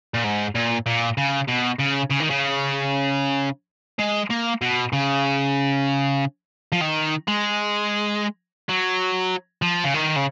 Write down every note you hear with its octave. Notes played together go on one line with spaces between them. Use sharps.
A#2
G#2
A#2
A#2
C#3
B2
C#3
C#3
D#3
C#3
G#3
A#3
B2
C#3
F3
D#3
G#3
F#3
F3
C#3
D#3
C#3